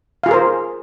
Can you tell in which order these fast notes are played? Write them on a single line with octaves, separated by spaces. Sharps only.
F5 F4 G#4 A#4 C5